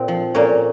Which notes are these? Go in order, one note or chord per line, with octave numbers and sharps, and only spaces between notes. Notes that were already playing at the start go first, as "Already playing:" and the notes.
Already playing: A#2 C4
F3
A#2 A#3 C#4